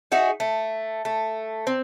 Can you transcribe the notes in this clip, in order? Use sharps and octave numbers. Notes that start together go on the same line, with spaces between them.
D#4 F#4 G#4 E5
A3
A3
C4